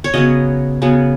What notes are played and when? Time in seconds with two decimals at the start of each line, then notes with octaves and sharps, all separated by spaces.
0.04 C#5
0.14 C#3 F#3 B3 D#5
0.82 C#3 F#3 B3